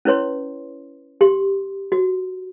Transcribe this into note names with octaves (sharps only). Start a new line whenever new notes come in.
C#4 E4 B4 C#5 C6
G4 C6
F#4